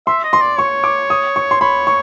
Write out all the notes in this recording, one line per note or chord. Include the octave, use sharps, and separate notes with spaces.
E5 C6
D#5
C6
D5
C#5 C#6
D6
D#6
C#6
C6
C#5 B5
C#6